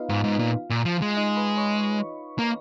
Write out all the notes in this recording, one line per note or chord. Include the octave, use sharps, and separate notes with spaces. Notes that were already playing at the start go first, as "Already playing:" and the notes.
Already playing: B3 D#4 F4 B4 D#5 F5
G#2
G#2
A#2
A#2
F3
G#3
D#4 D#5
B4 B5
C#5 C#6
A#3